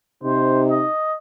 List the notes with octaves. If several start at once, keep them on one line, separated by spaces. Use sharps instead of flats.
C3 D#4 C5
D#5